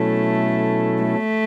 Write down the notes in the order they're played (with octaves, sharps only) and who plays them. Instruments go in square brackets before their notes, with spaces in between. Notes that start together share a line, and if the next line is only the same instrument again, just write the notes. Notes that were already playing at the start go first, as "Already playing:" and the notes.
Already playing: [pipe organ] B2 F#3 C#4 E4 A4 [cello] A3
[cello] A3